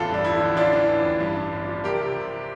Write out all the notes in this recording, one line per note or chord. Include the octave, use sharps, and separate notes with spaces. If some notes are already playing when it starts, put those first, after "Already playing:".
Already playing: A1 E2 F4 A4
G2 D4
F3 E4
D3
A1 D4 F4
E3
A1
A1
G2
G2
G1
F3
C2 G4 A#4
C3
C3